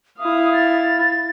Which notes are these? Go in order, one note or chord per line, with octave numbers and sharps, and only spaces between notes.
E4 F5 D#6
A6